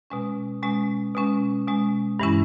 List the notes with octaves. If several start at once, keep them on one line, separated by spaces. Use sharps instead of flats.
B2 G#3 C#4
B2 G#3 C#4
B2 G#3 C#4
B2 G#3 C#4
G2 E3 G#3 C#4 E4